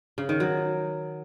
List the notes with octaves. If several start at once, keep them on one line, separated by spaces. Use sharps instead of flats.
C#3
D#3
F#3